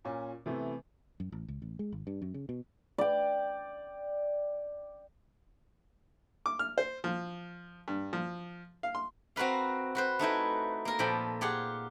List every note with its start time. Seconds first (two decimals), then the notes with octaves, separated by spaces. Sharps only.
0.05 A#2 C#4
0.46 C3 E3 A3 B3
1.20 F#2
1.32 A1
1.49 C#2
1.62 A1
1.79 G#3
1.92 G#1
2.07 G2
2.22 F#2
2.34 C#3
2.49 B2
2.98 D5 G5
6.46 D6
6.59 F6
6.78 C5
7.04 F3
7.88 G2
8.13 F3
8.83 F5
8.95 C6
9.36 C4 F#4 A#4 B4 F5
9.95 F#4 B4 C5
10.19 A3 D#4 E4 B4
10.85 A#3 A#4
10.99 A#2 F3 A4 G5 B5
11.41 F4 G4 G#4 F#5